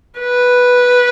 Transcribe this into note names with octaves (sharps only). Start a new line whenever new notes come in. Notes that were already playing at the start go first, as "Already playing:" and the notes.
B4